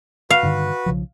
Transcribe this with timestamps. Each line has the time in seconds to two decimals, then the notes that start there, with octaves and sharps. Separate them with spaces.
0.30 F#4 B4 F5
0.43 G2 D3 D#3
0.86 B1 C#3 F3